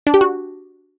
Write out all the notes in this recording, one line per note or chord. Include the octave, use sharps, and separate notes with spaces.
D4
G4
F#4